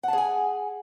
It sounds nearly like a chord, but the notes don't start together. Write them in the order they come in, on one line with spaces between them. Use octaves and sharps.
F#5 A5 G#4 G#5